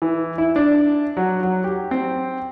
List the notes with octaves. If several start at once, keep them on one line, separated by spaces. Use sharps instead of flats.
E3
E4
D4
F#3
F#3
G4
C4